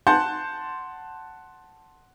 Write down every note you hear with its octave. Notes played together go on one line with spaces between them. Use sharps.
F#5 A5 C6 G6